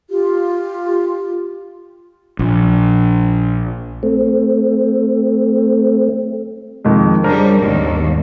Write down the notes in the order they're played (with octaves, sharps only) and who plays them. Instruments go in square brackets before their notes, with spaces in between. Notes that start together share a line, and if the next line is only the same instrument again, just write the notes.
[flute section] F4 G4
[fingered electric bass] A#1
[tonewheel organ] A3 C4
[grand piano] F2 D#3 G#3
[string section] C#3 G3 [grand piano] D4 A#4 C5
[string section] G#1 D#2 B2